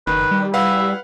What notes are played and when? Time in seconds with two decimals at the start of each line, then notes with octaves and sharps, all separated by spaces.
0.07 F#1 D#3 B4
0.31 G3
0.54 E4 B4 F5 F#5